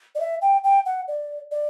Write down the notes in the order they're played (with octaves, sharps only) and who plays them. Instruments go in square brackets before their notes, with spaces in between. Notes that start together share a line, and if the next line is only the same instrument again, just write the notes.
[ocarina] D5
E5
G5
G5
F#5
D5
D5